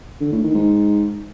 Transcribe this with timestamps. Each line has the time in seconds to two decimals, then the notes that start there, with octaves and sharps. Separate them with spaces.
0.21 D3
0.32 A2
0.43 D#3
0.54 G#2